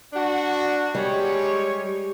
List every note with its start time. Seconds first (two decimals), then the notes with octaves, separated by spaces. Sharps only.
0.13 D4 F#4
0.95 G3 G#3 G4 C#5